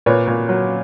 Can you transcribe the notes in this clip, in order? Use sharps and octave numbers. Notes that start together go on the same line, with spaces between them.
A#2 B4 C#5
A#2
F#3